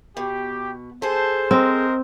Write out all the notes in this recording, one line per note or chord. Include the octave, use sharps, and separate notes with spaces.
B2 G4
G#4 A4 C5
C4 A#4 C5 D#5